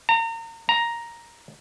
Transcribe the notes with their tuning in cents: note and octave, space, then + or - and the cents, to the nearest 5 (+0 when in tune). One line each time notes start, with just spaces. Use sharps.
A#5 -35
A#5 +5